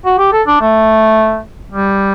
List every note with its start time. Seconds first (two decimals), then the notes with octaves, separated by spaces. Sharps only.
0.05 F#4
0.18 G4
0.32 A4
0.47 D4
0.61 A3
1.72 G3